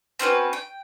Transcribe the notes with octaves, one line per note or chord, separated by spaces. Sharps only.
C4 C#4 F#4 B4
G5